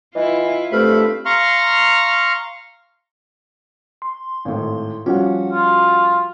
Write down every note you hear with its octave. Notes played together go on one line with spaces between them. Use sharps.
E3 E4 F4 D#5
G2 A3 C4 F4 C5 B5 F6
F5 A#5 C6 C#6 F6
C6
G#1 A2
F3 G3 C#4 F#4 F#5
F4